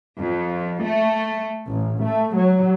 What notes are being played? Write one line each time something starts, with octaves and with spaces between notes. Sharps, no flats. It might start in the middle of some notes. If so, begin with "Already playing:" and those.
F2
A3
A1
A3
F#3